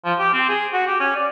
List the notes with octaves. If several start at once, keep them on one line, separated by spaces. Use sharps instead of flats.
F3
G4
C4
G#4
F#4
G4
C#4
D5